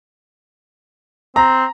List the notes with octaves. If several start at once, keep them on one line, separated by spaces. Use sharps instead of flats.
C4 A#5